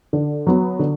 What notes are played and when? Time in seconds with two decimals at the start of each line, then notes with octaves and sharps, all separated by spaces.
0.13 D3
0.47 F#3 B3
0.79 D3